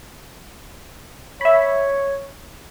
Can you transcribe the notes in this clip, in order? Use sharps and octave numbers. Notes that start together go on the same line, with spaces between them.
C#5 E5 B5